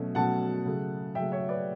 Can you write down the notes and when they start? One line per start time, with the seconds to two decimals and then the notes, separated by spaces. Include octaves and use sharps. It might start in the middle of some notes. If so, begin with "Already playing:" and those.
Already playing: B2 F#3 A3 C#4
0.15 B2 F#3 A3 C#4 F#5 A5
0.65 C#3 F#3 A3
1.15 C#3 F#3 A3 E5 G5
1.32 C#5 E5
1.49 B4 D5